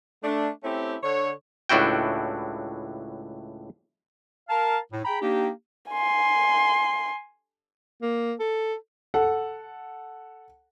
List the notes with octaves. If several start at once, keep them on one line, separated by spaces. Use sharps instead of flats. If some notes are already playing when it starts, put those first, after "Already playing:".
A3 D4
A3 C4 C#4 E4 G4
D3 C#5
C#2 A2 D4 E4 F#4 G5
A#4 F5 A5
A2
G#4 G5 A#5 B5
A#3 D4 D#4 G4
G#5 C6
A#3
A4
A4 F#5